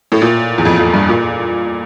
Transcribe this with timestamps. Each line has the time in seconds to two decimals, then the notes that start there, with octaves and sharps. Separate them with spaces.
0.12 A2
0.22 A#2
0.58 E2
0.65 F2
0.79 F2
0.94 G2
1.09 A#2